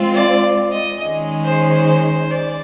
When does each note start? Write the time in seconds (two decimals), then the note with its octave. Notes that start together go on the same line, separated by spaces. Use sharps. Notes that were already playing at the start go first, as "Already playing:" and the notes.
Already playing: G#3 C4 F4
0.14 D5
0.72 D#5
1.01 D#3 G#3 C#4
1.44 C5
1.87 C5
2.31 D5